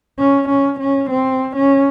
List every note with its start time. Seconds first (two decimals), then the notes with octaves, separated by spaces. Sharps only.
0.19 C#4
0.48 C#4
0.79 C#4
1.10 C4
1.56 C#4